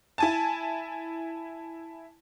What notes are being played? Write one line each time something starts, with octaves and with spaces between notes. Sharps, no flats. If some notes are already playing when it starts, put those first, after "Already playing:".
E4 G#5 A5